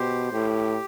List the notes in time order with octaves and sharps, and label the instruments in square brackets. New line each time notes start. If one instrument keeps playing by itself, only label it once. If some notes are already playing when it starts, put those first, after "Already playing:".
Already playing: [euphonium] B2 [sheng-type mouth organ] G4 C5
[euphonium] A2 [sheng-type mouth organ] G4